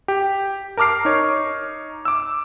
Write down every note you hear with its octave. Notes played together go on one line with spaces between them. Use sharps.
G4
A#4 A5 D6 F6 C7
D#4 C#5
D6 E6